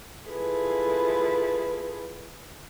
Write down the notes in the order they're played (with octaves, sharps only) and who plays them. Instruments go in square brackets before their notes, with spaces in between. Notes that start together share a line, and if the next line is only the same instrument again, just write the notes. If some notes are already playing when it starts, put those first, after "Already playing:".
[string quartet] E4 F4 G#4 A4 B4